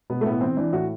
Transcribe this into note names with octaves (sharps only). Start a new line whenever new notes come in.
B2 B3
A3
A2 B3
E3 C4
E3 D4
A2 F#4